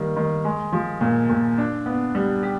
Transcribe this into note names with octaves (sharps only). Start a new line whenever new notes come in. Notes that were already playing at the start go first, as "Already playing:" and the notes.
Already playing: D#3 G3 A#3
D#3
G#3
F3
A#2
A#2
D4
B3
G3
G4